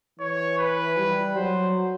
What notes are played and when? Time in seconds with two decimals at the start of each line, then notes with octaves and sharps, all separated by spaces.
0.19 E3 C#5
0.58 B4
0.97 G3
1.36 F#3 C5